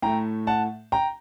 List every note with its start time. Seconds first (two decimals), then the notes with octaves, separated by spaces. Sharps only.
0.02 A2 A3 G5 A#5
0.47 F#5 A5
0.92 G5 A#5